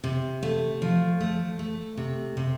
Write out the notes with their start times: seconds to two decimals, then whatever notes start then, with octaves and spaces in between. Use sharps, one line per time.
0.04 C3
0.43 A3
0.82 F3
1.21 A3
1.59 A3
1.97 C3
2.37 C3